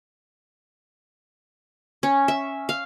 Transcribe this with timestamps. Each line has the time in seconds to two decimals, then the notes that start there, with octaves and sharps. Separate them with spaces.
2.03 C#4
2.28 E5
2.69 F5